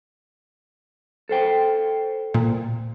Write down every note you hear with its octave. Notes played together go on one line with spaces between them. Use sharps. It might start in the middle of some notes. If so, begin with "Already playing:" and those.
A4 C5 G5
A#2